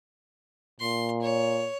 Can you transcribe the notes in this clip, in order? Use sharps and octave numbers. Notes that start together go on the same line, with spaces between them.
A#2 C6
C#5